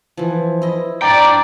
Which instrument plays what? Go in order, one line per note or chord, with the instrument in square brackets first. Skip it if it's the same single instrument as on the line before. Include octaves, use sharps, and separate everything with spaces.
[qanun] E3 F3
E4 D#5
[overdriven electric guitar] D4 G5 [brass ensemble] D5 [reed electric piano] A#5